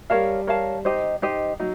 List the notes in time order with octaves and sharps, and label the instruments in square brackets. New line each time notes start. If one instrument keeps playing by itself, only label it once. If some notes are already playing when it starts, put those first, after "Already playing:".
[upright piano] G3 [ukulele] A#4 C#5 F5 A5
[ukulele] A#4 C#5 F5 A5
D#4 G4 C5 D#5
D#4 G4 C5 D#5
[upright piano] F#3 [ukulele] D#4